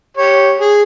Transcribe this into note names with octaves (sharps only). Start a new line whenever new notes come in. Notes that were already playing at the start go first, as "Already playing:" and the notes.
G4 C#5
G#4